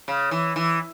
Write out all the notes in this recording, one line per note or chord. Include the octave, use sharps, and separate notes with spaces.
C#3
E3
E3